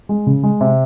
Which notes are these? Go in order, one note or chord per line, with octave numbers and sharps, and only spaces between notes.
G#3
C#3
G#3
C3